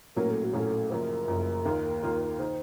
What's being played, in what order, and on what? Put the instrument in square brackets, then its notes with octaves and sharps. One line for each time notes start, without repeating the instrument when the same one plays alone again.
[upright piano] A#1 A2 F#3 A#3 C#4 [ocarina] A#4
[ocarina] A4
F#4
[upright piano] A#1 A2 F#3 A#3 C#4 [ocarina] A4
[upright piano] F#1 F#2 F3 [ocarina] A#4 C5
[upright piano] F#1 F#2 F3
D#2 D#3 A#3 F4
D#2 D#3 A#3 F4
[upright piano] D#3 [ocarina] C5